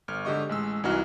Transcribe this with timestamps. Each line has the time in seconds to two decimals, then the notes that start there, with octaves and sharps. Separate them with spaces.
0.08 G1 F6
0.25 G#2 D3 G4 D#5 C#6
0.49 A1 G#3 E6
0.84 C2 E3 D#4 F#4 F6